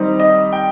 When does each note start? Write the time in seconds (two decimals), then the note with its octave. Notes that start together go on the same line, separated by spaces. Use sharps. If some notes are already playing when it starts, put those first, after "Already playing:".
Already playing: D#3 G3 C4 D#4
0.20 D#5
0.53 G5